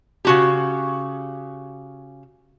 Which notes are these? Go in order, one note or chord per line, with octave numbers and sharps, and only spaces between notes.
C#3 F#4 G4